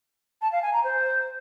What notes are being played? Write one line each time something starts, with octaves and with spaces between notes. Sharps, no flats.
A5
F5
G#5
A#5
C5